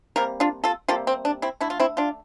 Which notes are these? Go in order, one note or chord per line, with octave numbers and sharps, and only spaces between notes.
C3 G3 A#3 A#4
D4 F4
F4 A4
C3 G3 A#3 F4 A4
C4
D4
C4 E4
D3 A3 E4
F4
C4 E4
D4 F4